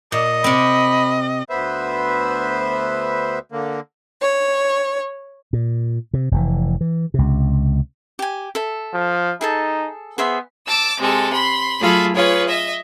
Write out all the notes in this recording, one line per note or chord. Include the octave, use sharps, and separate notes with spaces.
A#2 D#5
C3 C4 B5
D2 B3 B4 C5 E5
D3 A#3
C#5
A#2
C3
F1 G#2 E3
E3
C#2 C3
G4 G#5
A4 E5
F3
D#4 G#4 A4 A5
B3 G#4 C5 E5
A5 D6 E6
C3 G#3 A4
B5 C6
F#3 A3 F4 G#4 A4 B5
F4 G#4 B4 C#5
D#5 E5